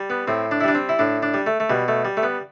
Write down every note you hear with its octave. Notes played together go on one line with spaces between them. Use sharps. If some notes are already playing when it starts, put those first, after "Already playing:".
Already playing: G3
B3
A2 C4
D4
E4
G3 D4
C4
E4
A2 D4
D4
G3
A3
A3
B2 G3
A3
G3
A3
B3